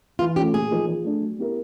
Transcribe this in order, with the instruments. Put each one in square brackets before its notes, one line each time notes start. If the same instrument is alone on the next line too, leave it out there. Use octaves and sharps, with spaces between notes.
[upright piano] E3 [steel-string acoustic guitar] F4
[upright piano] A3 C#4 F4 [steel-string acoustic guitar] G4
[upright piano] A#2 [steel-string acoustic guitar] G#4
[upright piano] F3 A#3 D#4
F3
A3 D4
F#3
B3 E4 G4 A#4